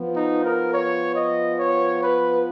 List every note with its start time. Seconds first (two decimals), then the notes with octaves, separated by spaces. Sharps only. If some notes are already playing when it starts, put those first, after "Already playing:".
Already playing: F3 B3
0.15 D#4
0.43 A#4
0.72 C#5
1.15 D#5
1.58 C#5
2.01 B4